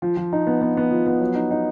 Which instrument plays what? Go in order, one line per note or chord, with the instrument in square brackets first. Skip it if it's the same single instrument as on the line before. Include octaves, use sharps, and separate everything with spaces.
[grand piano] F3
F3
D#4
B3
B3
B3
F3
B3
F#3
D#4
D#4